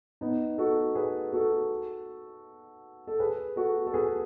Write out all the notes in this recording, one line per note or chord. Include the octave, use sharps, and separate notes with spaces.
B3 D#4
F#4 A4
G#4 B4
F#4 A4
A4
G#4 B4
F#4 A4
A4
G#4 B4